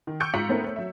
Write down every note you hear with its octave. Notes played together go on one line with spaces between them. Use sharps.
D#3
C#6 D6 E6 G6 C#7 D7
G#2 F4 A#5 B6 C#7 F#7
A3 B3 C4 D#4 A#4 C5
A3 C#5
F#3 E5